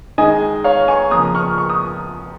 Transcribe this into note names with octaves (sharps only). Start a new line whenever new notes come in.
D#3 G#3 D#5 G#5
C#5 F5
G#5 C#6
C#3 F3 A#3 A#5 D#6
C#6 F6
C#6
D#6